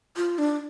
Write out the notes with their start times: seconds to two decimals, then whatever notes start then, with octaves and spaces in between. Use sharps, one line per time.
0.17 F4
0.38 D4